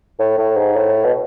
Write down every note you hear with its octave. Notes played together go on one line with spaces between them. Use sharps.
A2
A2
G#2
A2
B2